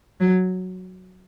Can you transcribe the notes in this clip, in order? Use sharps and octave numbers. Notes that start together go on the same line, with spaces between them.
F#3